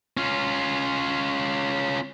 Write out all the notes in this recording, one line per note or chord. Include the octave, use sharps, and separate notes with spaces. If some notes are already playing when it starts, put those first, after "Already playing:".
C#4 F4